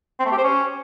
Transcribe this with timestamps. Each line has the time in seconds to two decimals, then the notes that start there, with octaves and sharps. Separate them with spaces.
0.20 C4
0.26 A3
0.32 G4
0.38 C5
0.44 C#4